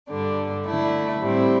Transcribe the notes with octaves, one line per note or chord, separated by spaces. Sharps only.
G2 D3 G3 D4
D3 A3 E4
A2 G3 C4 E4